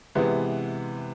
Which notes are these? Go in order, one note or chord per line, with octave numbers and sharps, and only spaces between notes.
C3 E3 G#3 B3